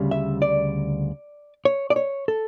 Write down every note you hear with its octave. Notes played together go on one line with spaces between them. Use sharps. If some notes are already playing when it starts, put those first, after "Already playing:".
Already playing: D2 C#3 G3
E5
D5
C#5
D5
C#5
A4